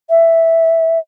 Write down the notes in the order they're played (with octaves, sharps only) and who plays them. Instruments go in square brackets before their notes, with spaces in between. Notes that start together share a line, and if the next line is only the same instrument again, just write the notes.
[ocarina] E5